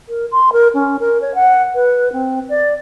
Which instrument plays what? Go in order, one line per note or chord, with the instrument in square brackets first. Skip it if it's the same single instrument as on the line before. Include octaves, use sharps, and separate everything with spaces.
[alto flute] A#4
C6
A#4
C#4
A#4
C#5
F#5
B4
C4
D5